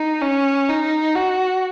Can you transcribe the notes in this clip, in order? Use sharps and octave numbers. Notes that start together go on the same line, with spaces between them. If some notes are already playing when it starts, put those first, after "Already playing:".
Already playing: D#4
C#4
D#4
F#4